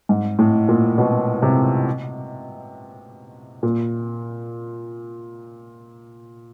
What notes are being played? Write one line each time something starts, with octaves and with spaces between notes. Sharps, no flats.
G#2
A2
A#2
B2
C3
A#2